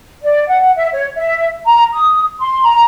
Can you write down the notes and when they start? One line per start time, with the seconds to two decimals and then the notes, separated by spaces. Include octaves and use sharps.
0.22 D5
0.47 F#5
0.75 E5
0.93 C#5
1.16 E5
1.66 A#5
1.92 D#6
2.39 C6
2.64 A#5